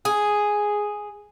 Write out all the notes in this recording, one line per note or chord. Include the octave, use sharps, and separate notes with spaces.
G#4